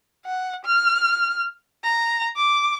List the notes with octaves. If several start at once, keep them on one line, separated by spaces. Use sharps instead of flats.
F#5
F6
A#5
D6